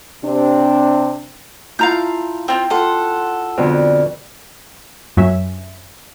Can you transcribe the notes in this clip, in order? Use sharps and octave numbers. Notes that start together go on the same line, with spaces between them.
C3 C4 D4
E4 F4 F5 A5 A#5 G6
C4 F4 G5
F4 A4 F#5 C6
F2 B2 D3
F#2 F#3 C#4 E5